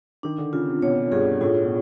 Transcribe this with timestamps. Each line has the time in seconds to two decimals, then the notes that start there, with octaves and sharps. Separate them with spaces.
0.23 D#3 D4
0.38 D3
0.53 C#3 F4
0.68 C3
0.82 B2 C#5
1.12 G2 G#4
1.41 A2 F4
1.65 B2